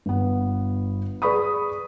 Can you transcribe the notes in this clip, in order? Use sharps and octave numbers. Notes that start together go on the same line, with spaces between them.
G1 B3
G#4 B4 D5 B5 C#6 D#6